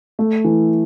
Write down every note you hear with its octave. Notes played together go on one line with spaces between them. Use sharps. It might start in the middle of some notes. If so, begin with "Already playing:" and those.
A3
E3